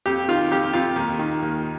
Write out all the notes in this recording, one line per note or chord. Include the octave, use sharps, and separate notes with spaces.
F2 G4
D#3 F4
F2 G4
F2 F4
D#2
D#3
D#2